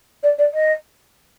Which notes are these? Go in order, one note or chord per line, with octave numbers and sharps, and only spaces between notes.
D5
D5
D#5